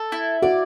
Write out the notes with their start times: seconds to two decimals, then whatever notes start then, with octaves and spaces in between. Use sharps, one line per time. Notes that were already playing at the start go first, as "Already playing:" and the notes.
Already playing: A4
0.12 E4
0.42 F#4 D5